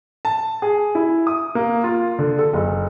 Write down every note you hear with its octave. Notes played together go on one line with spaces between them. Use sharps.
A5
G#4
E4
D#6
A#3
F4
D3
A4
F#1